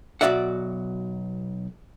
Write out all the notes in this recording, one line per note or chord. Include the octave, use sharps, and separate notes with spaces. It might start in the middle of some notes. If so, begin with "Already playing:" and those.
B1 B2 F#4 D5 E5 F#5